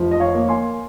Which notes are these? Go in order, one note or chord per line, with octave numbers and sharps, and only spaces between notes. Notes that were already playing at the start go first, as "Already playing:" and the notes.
Already playing: F1 F3
D#5
C#5 F5
A#3
G#5 C6